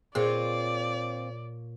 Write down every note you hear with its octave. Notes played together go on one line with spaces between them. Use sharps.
A#2 C4 F4 G#4 C#5 D5